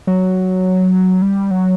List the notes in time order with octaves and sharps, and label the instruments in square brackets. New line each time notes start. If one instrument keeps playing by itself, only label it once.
[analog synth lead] F#3
G3
F#3